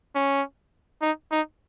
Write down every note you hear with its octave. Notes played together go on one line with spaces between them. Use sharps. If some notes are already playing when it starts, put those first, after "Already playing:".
C#4
D#4
D#4